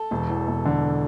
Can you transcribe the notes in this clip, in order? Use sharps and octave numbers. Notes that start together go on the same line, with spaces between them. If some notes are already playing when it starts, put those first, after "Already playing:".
Already playing: A4
E1
E2
E1
D3